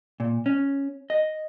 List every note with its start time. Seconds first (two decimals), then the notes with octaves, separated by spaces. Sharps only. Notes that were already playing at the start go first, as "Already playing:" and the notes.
0.20 A#2
0.46 C#4
1.10 D#5